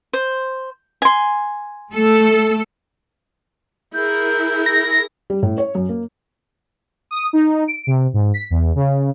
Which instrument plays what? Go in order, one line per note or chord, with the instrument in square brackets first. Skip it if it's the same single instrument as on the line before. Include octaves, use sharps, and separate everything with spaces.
[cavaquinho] C5
G#5 C6
[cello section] A3 A4
[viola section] E4 G#4 A#4 [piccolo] G6
[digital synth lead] A#6
[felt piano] G3
A2
C#5
F#2
A#3
[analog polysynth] D#6
D#4
D7
C3
G#2
B6
E2
C#3